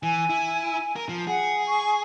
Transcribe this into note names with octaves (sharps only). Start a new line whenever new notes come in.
E3 G#5
E4
A#4
F3
G#4 F#5
C#6